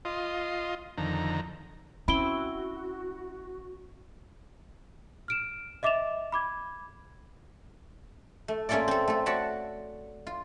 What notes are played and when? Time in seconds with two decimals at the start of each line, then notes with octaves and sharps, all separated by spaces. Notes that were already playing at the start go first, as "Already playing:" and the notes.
0.05 F4 D#5 C6
0.98 F2 D3 D#3 A#5
2.08 C4 C#4 E4 F#4 B5 D7 G7
5.28 F6 D7 E7
5.83 D#5 E5 D6 A6 E7 F7
6.32 B5 D6 G#6
8.48 A3
8.69 A3 A#3 C#4 F4 A4 D5
8.88 C4 A4
9.08 A3 A4
9.26 F#4 C#5 D5 A5 B5
10.27 F4